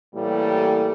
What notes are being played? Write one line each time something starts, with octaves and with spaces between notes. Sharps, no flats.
A2 E3 G3 A#3